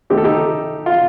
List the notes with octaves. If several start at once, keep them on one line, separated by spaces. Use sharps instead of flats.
D#3 A3 C4 G4
A4
D#4 G4
F4